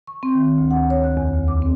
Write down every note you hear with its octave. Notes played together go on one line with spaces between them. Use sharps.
C#6
C4
D#3
D2
F#5
C#5
F#6
E2
D2
D6
C4